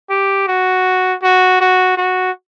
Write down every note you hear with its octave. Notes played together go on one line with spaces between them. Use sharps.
G4
F#4
F#4
F#4
F#4